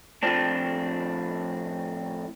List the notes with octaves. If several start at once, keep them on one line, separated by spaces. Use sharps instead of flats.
F2 A2 F3 C4 D4